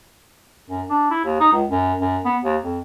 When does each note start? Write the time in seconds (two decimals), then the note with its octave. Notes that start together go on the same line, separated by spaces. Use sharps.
0.70 F#2
0.90 D4
1.11 E4
1.25 D#2
1.40 D#4
1.53 C#2
1.69 F#2
2.00 F#2
2.25 B3
2.44 D#2
2.63 F2